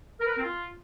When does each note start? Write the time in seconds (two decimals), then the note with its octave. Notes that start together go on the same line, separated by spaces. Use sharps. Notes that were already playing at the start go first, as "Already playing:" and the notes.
0.20 A#4
0.26 B4
0.31 A#4
0.37 C4
0.42 F4